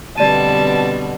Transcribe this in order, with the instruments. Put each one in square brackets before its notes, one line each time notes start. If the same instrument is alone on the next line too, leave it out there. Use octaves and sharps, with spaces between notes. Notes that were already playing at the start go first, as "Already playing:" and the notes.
[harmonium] B2 [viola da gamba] D3 G3 C4 [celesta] D5 D#7 [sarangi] A5